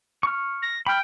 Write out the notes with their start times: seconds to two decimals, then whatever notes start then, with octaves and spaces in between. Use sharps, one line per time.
0.23 C#6 F6
0.62 A#6
0.86 G5 B5 F6